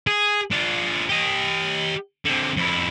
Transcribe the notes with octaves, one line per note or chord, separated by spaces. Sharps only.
G#4
D4 F4
G4 D#5
D3 C4
F2 E4